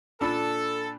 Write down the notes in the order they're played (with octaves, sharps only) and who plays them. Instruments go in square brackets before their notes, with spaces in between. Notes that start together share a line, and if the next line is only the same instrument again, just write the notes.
[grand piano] A#2 D4 B5 [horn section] A4